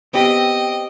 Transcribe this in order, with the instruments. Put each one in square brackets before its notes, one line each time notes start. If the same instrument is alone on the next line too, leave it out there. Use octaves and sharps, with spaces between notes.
[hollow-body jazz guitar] B3 C4 G4 [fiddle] D#5 [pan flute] G5